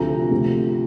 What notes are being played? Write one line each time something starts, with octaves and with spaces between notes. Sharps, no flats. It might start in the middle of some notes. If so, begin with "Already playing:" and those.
Already playing: D2 C3 F3 A3 A#5
D2 C3 F3